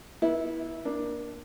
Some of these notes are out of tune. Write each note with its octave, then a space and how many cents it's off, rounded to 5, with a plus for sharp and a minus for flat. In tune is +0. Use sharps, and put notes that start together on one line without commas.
B3 -35 E4 -15
A#3 +25 D4 +0